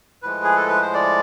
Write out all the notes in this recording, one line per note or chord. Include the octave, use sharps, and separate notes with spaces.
A2 F3 G#3 B4
G#4
A4
B4
C5
D5